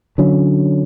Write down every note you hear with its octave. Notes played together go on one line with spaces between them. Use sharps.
D3 F#3 C#4